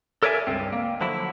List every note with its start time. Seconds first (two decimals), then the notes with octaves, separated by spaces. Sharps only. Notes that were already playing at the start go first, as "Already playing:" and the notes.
0.23 A4 A#4 C#5 D5 E5 G#5
0.47 C#2 G2 C4
0.73 A#3
1.01 D3 F3 F#3 E4